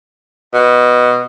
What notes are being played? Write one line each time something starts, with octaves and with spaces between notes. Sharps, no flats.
B2